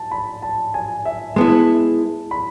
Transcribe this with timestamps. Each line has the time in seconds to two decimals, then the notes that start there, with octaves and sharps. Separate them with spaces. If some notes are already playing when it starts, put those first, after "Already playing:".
Already playing: A5
0.11 B5
0.42 A5
0.74 G#5
1.05 E5
1.36 G#3 B3 E4 A5
2.31 B5